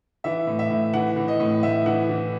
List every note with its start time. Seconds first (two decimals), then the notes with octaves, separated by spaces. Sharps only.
0.24 E3 E5
0.47 A2
0.59 E5
0.70 A2
0.94 E3 F#5
1.16 E3
1.28 D#5
1.40 A2
1.63 A2 E5
1.86 E3 F#5
2.09 E3